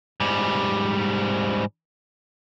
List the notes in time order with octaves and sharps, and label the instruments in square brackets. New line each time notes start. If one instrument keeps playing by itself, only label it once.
[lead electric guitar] G#2 G3